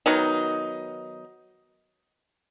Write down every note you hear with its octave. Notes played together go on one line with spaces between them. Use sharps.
D#3 F#3 B3 D#4